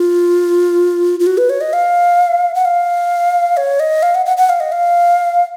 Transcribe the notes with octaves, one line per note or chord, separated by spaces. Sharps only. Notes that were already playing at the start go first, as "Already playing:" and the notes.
Already playing: F4
F4
F#4
B4
C#5
D#5
F5
F#5
F5
C#5
D#5
F5
F#5
F#5
F#5
F5
D#5
F5